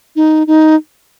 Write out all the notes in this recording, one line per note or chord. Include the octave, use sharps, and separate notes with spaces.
D#4
D#4